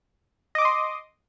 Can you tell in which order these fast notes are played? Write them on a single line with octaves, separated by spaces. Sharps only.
D#5 D6 D#6 C6